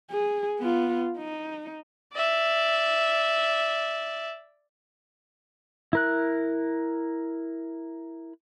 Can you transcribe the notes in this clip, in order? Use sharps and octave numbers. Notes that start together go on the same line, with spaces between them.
G#4
B3 F4
D#4
D5 E5
E4 A#4 F#6